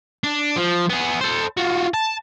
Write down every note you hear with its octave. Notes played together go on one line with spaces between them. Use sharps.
D4
F3
B3 G#4
A4 C5
F4 F#4
A5